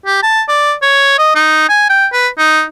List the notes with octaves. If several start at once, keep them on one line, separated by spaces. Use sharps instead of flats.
G4
A5
D5
C#5
D#5
D#4
G#5
G5
B4
D#4